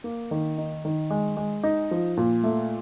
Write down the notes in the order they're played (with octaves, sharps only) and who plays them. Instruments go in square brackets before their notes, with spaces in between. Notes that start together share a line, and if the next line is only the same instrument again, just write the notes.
[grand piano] A#3
D#3
D#4
D#3
G#3
G#3
D#4
F3
A#2
A3